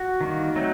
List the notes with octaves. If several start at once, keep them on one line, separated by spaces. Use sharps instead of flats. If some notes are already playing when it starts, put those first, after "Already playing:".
Already playing: F#4
D#3 G3 A#3
F#3 A3 C4 D#4